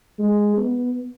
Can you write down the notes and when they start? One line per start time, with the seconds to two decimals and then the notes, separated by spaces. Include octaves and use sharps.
0.19 G#3
0.57 B3